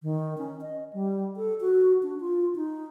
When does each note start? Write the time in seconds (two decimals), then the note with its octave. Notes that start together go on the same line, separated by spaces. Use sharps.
0.03 D#3
0.38 C#4
0.61 D#5
0.93 G3
1.36 A4
1.60 F#4
2.03 D4
2.20 F4
2.55 D#4